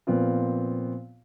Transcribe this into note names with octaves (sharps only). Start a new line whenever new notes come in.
A#2 F3 B3 C4 F4